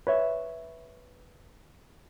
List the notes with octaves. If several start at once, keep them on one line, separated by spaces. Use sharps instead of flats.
B4 C#5 E5